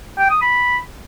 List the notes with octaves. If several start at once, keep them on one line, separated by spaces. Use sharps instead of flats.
G5
D#6
B5